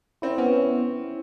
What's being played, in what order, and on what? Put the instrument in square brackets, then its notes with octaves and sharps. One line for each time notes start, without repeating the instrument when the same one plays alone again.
[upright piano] C4 [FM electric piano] E4
[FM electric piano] B3 [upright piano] C#4